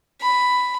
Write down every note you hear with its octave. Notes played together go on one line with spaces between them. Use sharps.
B5